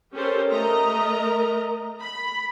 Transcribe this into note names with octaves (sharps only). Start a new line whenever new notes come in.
C#4 G4 A4 A#4 C5 C#5
A3 A#4 D#5 A#5
B5